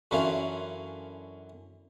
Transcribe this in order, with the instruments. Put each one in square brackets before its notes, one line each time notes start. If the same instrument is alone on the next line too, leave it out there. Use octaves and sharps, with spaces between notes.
[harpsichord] F#2 D3 E3 F#3 C#4 F4